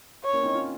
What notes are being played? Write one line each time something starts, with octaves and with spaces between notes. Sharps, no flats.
C#5
A#3 C#4
C4 D#4
C#4 F4